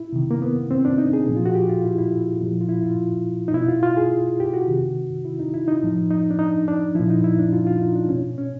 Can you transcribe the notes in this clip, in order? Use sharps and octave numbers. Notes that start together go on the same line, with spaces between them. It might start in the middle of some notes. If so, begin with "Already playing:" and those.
Already playing: E4
C3 D#3
A#3
B3
C4
D4
D#4
G#4
A#2 F3
F4
F#4
G4
F4
E4
E4
A#2 F3
F4
E4
F4
D#4
B2 E4
F4
F4
G#4
G4
F#4
C3 D#3
E4
D#4
E4
D#4
A2 F3
D#4
D4
D#4
D4
A#2 F3 E4
D#4
E4
D4
F4
F4
D#4
D4
B2 C#4
C#4